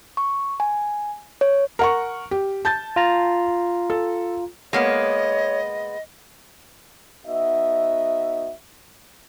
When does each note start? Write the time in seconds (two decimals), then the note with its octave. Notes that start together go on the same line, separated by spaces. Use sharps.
0.17 C#6
0.60 G#5
1.41 C#5
1.79 A#4 F#5 C#6
2.31 G4
2.65 A5 G6 A6
2.96 F4 A#5
3.90 A4
4.73 G#3 A#3 B3 C#5 D#5
7.26 B3 D#4 F#4 D#5 E5